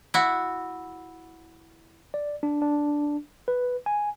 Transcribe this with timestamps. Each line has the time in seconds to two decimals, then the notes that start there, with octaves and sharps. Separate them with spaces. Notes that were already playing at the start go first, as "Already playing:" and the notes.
0.14 E4 F#4
2.14 D5
2.43 D4
2.62 D4
3.48 B4
3.86 G#5